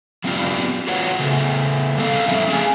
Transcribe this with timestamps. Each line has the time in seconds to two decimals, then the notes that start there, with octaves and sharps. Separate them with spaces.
0.24 F#3 B3 C4 D4 F4 G4
0.87 F4 F#4 B4 C#5 F#5
1.19 C#3 A3 B3
1.98 G3 C4 A4 F5
2.28 F3 F#3 D#4 A4 E5
2.47 A3 C#4 D4 G#4 F5 G#5